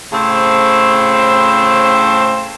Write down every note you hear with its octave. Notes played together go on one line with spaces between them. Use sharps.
A2 C#3 C4 C5